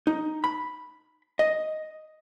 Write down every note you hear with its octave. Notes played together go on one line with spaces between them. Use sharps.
D#4
B5
D#5